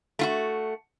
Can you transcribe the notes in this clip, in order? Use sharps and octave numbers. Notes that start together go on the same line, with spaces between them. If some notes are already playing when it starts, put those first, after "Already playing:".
A3 F4 F#4